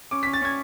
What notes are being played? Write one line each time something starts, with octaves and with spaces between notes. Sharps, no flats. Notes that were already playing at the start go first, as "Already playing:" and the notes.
C#4 D6
C#4 B6
A6
C#4 G#6